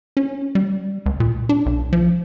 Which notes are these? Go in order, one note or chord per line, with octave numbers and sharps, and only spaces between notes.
C#4
G3
C#2
A#2
D4
B1
F3